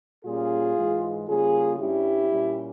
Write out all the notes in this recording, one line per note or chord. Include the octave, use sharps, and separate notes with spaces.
A#2 G3 A#3 C#4 F4 G#4
G#2 E3 G#3
C#3 G3 A#3 F4 G#4
G2 G3 C#4 E4 G4
A#2 G3 C#4